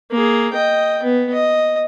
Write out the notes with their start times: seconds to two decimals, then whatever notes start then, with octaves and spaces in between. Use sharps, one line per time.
0.11 A#3 G#4
0.53 D#5 G5
1.03 B3
1.33 D#5